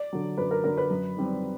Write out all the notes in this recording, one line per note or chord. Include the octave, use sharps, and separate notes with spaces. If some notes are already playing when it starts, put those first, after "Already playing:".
Already playing: D5
D3 F#3
F#2 B4
A#4
D3 F#3 A#4
B4
F#2
D#3 G3 C4